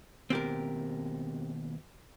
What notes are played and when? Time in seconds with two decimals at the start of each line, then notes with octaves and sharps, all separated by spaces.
0.30 D#2 B2 C4 G4 A#4